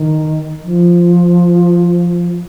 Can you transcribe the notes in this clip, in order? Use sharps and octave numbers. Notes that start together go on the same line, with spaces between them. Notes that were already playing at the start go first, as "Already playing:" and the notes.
Already playing: D#3
F3